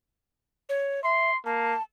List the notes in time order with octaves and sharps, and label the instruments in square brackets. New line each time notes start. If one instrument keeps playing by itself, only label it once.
[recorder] C#5
[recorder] E5 [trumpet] C6
[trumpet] A#3 [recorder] A5